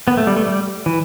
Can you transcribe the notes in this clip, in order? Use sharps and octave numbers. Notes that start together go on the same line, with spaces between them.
B3
A3
G3
A3
G3
E3